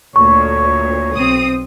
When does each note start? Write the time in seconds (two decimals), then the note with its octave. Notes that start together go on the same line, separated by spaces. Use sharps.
0.16 D2 A#2 C#5 C#6
1.16 B1 C4 D#6